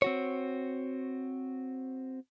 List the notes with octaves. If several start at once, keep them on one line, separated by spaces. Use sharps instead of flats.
C4 F#4 C#5